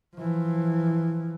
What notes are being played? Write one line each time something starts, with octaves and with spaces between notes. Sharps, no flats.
E3 F3